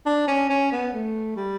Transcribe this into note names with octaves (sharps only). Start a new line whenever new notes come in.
D4
C#4
C#4
B3
A3
G3